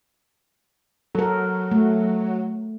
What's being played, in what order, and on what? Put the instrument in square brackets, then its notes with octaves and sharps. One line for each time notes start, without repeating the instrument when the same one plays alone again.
[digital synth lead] F#3 [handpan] A4 A#4
[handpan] A3